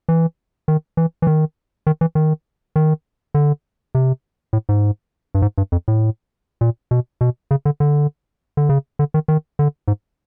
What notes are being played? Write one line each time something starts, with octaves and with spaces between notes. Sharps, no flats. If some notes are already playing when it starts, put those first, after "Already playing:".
E3
D#3
E3
E3
D#3
D#3
E3
D#3
D#3
D3
C3
A2
G#2
G2
G#2
G2
F2
A2
A#2
B2
B2
C#3
D3
D3
D3
C#3
D3
D#3
D#3
D3
G#2